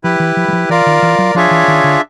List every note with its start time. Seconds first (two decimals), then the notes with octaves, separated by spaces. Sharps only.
0.04 F3 E4 G4 B4
0.20 E3
0.37 F3
0.48 F#3
0.53 F3
0.69 E3 F4 A#4 D5
0.86 D#3
1.02 E3
1.18 F#3
1.35 F3 D4 F4 G#4 C#5 E5
1.51 E3
1.68 D#3
1.84 D3